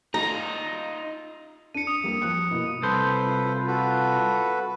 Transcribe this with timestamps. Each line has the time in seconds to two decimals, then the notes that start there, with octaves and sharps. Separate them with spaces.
0.14 D#4 F4 A#5
1.75 D4 C#7 D#7
1.87 D#6
2.04 G3 A#3 G4
2.22 F3 F#6 C#7
2.50 B2 A#3 E4
2.83 C2 A4 B4 C5
3.27 F4
3.67 F#4 A4 B4